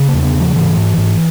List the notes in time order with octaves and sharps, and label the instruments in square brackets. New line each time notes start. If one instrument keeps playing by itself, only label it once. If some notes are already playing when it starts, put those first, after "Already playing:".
Already playing: [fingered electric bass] C#3
A#3
E2
B3
C#3
F3
G#2 E3
G#2
G#2